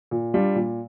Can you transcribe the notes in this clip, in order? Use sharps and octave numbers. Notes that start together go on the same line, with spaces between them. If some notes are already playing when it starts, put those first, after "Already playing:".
A#2
G3 D4 F4
A#2